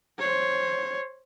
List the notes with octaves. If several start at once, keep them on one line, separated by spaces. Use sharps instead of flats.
C5 C#5